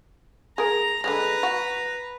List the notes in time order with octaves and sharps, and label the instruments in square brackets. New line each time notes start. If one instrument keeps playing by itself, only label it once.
[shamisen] G#4 A#4 [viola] A#5
[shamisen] D3 D#3 G#3 [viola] B4 A#5
[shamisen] F#4